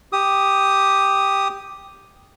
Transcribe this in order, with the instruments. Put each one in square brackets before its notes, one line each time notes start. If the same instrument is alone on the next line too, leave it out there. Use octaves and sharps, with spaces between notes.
[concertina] G4 D#6